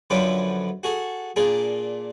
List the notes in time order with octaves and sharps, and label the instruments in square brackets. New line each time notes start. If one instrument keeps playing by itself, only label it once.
[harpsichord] F#2 D3 F3 C#4 B4 D6
F#4 G#4 A4
A#2 A#3 D4 G#4